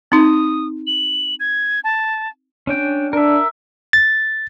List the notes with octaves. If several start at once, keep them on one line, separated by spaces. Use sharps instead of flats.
C4 D#4 D#6
F#7
G#6
A5
C#4 D4 G5
D4 A#4 E5
A6